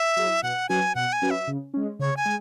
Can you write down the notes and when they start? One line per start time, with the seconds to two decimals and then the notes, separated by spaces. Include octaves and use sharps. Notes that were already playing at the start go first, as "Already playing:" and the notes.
Already playing: E5
0.17 F#3 E4 G#4
0.43 B2 F#5
0.69 F#3 C#4 F#4 B4 G#5
0.95 B2 F#5
1.13 G#5
1.22 F#3 C#4 F#4 B4
1.30 E5
1.47 C#3
1.74 G#3 C#4
1.99 C#3 C#5
2.17 G#5
2.26 G#3